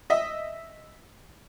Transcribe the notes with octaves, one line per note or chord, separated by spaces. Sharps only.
D#5 E5